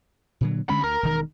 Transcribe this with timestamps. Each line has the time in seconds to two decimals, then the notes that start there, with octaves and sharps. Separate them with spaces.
0.41 A#2 D3 F#3
0.69 D2 D3 G#3 C#4 B5
0.84 D2 A#4
1.03 E1 D#3